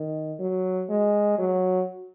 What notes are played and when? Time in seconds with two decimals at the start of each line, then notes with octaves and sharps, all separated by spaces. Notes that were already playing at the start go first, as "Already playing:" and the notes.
Already playing: D#3
0.39 F#3
0.89 G#3
1.39 F#3